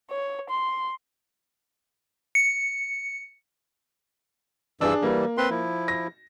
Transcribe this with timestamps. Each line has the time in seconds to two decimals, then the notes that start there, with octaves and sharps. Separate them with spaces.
0.10 C#5
0.50 C6
2.35 C#7
4.81 G2 E3 D4 G#4 E6
5.03 E3 G3 A#3
5.38 C4 B4 C6
5.50 F3 E4
5.88 A#6